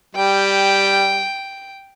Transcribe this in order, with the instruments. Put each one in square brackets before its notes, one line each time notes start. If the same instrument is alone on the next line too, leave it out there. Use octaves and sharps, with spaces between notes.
[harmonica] G3 [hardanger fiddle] G5